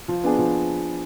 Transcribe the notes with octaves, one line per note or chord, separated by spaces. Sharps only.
F3
B3 D4 G#4
F3